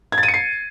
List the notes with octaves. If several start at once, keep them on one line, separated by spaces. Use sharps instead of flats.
G#6
A6
D#7
C#7
C7